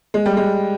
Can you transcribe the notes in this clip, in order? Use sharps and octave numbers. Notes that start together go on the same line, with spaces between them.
G#3
G3
G#3